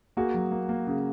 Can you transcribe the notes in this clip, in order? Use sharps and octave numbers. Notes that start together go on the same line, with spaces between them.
A#3 F#4 G#4
F#3
A#3
A#3
C#3